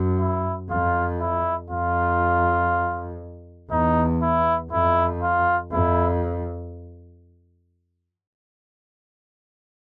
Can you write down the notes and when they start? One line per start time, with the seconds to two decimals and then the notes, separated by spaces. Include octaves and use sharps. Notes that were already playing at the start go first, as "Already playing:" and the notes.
Already playing: F#2
0.20 E4
0.70 F2 F4
1.20 E4
1.70 F2 F4
3.71 E2 D#4
4.22 E4
4.71 F2 E4
5.22 F4
5.71 F2 E4